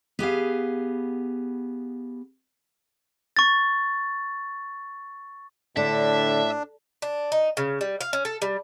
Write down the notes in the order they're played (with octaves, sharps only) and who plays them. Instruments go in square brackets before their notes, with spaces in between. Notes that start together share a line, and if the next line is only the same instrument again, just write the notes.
[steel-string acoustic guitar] B3 G4 G#4 F5
[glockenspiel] C#6 A6
[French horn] A2 [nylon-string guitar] D3 [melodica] D4 [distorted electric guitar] E5
[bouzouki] D4
D#4
C#3
G3
F5
C#4
A4
G3